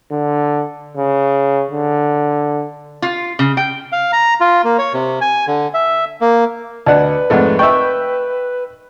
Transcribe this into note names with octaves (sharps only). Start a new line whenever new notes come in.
D3
C#3
D3
F4
C#3
G5
F5
A#5
F4
A#3
C#5
C3
G#5
D3
E5
A#3
D2 B4 D5 D#5 F#5 A5
F2 G#2 A3 A#4 D#5 F#5
D#4 D#5 E5 G5 C#6